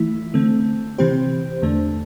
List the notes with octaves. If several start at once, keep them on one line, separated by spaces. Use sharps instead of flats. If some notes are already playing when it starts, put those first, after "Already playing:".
Already playing: E3 A3 E4
D3 A3 C4
C3 E3 C4 G4 C5
E2 D3 A3 D4